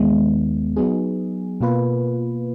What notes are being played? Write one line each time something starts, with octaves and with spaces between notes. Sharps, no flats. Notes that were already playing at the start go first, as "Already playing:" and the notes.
Already playing: D#2 D#3 G#3 B3
F#3 B3 D#4 G#4
B2 A#3 F4 B4